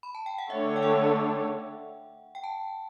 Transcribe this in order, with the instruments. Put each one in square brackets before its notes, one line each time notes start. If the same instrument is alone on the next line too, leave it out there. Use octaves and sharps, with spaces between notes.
[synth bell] B5
A5
G5
F#5
[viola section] D3 A3 D4 A4 C#5 [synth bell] E5
[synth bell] G5
F#5
G5
A5